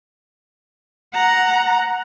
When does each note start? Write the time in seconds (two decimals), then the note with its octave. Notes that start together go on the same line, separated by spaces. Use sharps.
1.14 F#5 A#5